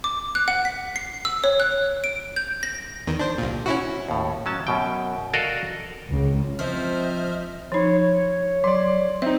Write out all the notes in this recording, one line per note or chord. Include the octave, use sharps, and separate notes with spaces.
D6
F#6
F#5
B6
C7
E6
C#5
F#6
D7
G6
A#6
E2 D#3
D4 C5
C2 A#2
C#4 E4 F#4
D#2 A2
F#3 C#4 A5
F#2 B2 G5
F#4 A4 A#4 D5 D#5 F5
C#2
F3 C4 C5 D#5 E5 F6
F3 D#4 C#5
C#5
F#3 D5 C6
C4 D#4 E5